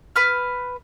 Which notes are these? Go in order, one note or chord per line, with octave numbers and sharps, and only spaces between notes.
B4 F6